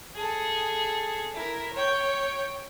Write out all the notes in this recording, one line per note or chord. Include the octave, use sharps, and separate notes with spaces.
G#4 A4
E4 A#4
C#5 G5